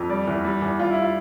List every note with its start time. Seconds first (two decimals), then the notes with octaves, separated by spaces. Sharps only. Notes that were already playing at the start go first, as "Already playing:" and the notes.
Already playing: F2
0.09 G3 D5
0.27 E2
0.44 G3
0.62 E2
0.79 G3 F4
0.90 E4
1.02 F4